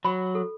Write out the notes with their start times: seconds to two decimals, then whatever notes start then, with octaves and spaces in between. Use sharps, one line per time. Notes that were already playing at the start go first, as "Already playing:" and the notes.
0.05 F#3 B5
0.35 A4